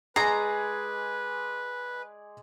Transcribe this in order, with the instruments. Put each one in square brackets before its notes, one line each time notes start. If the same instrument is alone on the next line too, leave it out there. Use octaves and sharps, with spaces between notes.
[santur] G#3 G#4 D5 [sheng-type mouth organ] B4 [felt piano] G#5 C7 [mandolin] A#5